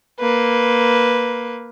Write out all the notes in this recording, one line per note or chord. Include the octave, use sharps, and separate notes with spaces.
A#3 B4